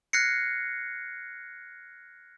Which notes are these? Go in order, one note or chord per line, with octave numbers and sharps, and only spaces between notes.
F6 F#6 G#6 A#6 C7 C#7